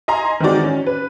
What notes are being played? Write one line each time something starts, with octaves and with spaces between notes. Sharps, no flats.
D#5 G#5 A#5 C6
D#3 E3 G#3 C4 F#4 D5
C#4
B4